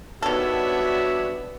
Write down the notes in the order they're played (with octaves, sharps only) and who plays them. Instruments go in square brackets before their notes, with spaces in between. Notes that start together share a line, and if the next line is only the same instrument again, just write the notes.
[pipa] D#3 A4 [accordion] G3 D4 C#5 [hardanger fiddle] B3 [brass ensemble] F#4 E5